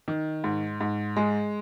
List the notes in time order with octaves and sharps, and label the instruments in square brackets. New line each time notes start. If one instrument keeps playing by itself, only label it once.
[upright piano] D#3
G#2
G#2
G#3